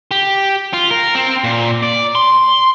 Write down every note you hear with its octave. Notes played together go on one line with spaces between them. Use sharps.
G4
F4
A#4
C4
A#2
D5
C6